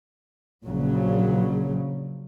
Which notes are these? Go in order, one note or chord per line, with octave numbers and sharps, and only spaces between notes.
A#1 A#2 C#3 F#3